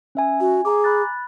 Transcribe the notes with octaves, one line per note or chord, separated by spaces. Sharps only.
C#4 E5 G#5
F#4 G#5
G#4 G#5 A#5 D6
B5 F#6 A6